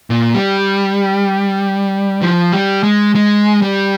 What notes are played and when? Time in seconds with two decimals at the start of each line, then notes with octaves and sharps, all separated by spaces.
0.10 A#2
0.35 G3
2.22 F3
2.52 G3
2.83 G#3
3.15 G#3
3.62 G3